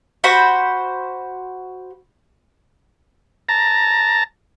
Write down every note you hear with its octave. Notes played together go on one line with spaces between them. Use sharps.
F#4 C5 B5
A5 A#5